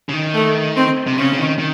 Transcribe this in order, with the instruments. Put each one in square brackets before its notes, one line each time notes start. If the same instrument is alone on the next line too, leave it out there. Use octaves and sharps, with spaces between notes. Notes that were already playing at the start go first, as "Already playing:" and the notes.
[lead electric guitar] C#3
D#3
[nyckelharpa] A3
C4
[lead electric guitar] C3
[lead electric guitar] C#3 [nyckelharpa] C#4
[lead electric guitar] C#3
D#3
D#3